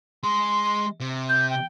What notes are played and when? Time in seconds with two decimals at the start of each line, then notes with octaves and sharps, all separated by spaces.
0.24 G#3 C6
1.00 C3
1.29 G6
1.50 G5